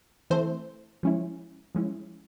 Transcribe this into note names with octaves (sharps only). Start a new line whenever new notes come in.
E3 A3 C4 C5
F3 G#3 C#4 E4
F3 G#3 C#4 E4